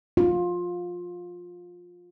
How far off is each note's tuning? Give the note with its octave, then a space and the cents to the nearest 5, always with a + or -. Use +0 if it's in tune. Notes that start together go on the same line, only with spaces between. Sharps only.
F4 +15